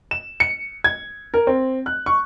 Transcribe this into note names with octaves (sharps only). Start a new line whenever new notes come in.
E7
C#7
G#6
A#4
C4
F#6
C#6